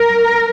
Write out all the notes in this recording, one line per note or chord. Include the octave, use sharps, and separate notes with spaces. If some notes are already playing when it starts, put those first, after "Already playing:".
Already playing: A#4